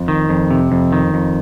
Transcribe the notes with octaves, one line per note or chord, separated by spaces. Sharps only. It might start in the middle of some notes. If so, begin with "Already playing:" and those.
Already playing: F2
D#3
F2
C3
F2
D#3
F2